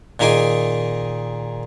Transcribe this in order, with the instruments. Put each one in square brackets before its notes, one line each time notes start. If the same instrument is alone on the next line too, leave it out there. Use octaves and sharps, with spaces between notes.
[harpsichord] A#2 D#3 D#4 G#4 G#5 D6